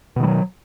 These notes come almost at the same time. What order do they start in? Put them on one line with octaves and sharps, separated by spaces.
B2 D#3 G3 F#3